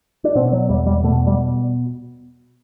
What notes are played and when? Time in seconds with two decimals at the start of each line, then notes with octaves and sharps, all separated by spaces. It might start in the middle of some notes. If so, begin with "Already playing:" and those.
0.24 D4
0.35 B2 C4
0.52 F#3
0.69 E2 G3
0.86 G3
1.03 B2 A3
1.27 G3